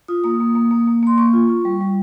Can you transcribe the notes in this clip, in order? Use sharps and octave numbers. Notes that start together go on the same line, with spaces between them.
F4 D#6
A#3 D#6
A#3
A#3
A#3
A#3
A#3 C6
A#3 C#6
F4
F4
G3
G3